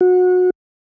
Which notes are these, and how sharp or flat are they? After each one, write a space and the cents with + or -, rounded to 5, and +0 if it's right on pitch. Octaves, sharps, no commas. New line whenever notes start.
F#4 -25